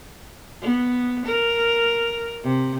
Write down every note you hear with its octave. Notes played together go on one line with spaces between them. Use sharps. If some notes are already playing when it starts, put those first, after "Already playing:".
B3
A#4
C3